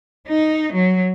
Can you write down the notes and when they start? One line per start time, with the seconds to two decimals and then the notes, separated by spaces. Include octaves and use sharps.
0.28 D#4
0.73 F#3